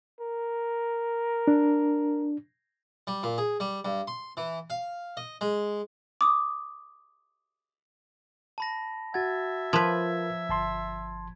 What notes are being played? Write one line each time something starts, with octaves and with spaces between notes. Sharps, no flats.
A#4
D4
G3
A#2
G#4
G3
G2
C6
E3
F5
D#5
G#3
D6 D#6
A5 B5 A#6
F#4 E5 F#5 G#6 A6
F3 F4 A#4 B4 G#6
G1 A5 C6